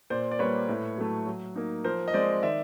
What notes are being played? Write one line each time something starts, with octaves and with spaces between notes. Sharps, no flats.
A#2 C5 D5
D5
G3 A#3 B4 C#5
A2
F#3 A3
F#3
A#3 D#4
F3 A#4 C5
D#5
G#3 C4 C5 D5
D#3 D5 E5